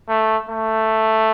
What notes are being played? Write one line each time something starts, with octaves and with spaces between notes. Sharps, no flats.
A3
A3